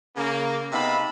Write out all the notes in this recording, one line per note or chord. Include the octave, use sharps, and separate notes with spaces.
C#3 A#3
C3 B3 D#4 F5 A5 B5